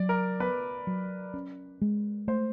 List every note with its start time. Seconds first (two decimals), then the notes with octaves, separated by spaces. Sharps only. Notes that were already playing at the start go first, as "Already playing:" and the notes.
Already playing: F#3 D5
0.09 A#4
0.40 B3 B4
0.87 F#3
1.34 C#4
1.81 G#3
2.28 A3 C5